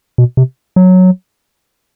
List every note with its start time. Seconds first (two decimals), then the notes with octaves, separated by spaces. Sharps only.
0.18 B2
0.37 C3
0.76 F#3